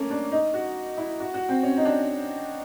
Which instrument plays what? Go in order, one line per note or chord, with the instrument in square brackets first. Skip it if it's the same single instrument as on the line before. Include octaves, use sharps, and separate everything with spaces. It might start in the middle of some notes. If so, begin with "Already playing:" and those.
Already playing: [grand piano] A3 A#3 C#4
D4
D#4
F#4
E4
F#4
F#4
C4
C#4
D#4
D4